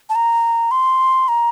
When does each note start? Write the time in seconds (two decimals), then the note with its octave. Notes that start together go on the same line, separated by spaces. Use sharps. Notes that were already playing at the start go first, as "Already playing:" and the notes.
0.10 A5
0.15 A#5
0.71 C6
1.28 A#5